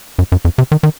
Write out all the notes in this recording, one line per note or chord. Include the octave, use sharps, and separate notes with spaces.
F#2
F#2
F2
C3
D#3
D#3